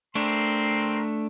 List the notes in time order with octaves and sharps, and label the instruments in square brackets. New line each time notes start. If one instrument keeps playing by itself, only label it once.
[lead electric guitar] A3 D4 [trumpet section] C4 A#4 C6